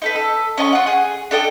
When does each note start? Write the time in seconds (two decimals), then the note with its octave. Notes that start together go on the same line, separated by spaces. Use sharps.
0.02 D#4 A4 B4
0.16 A4
0.58 C#4 D#5 A5 C#6
0.72 F4 F#5
0.86 G#4
1.31 D4 A4 D#5 G5